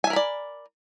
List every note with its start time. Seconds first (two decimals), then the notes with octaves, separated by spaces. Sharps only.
0.04 G#5
0.07 E5
0.10 A#4
0.13 B5
0.16 D5